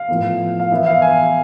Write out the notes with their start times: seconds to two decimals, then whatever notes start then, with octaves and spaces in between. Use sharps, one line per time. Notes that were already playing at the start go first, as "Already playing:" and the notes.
Already playing: F5
0.08 A2 F3 B3
0.60 F5
0.72 E3 B3 E4 E5
0.86 F5
1.02 G#5